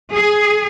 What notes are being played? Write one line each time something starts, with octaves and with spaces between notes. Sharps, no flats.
G#4